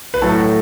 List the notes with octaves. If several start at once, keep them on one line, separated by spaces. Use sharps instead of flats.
B4
A2 F#3 A3 A4